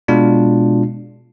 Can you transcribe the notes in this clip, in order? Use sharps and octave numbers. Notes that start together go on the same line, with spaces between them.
B2 G#3 D4 F4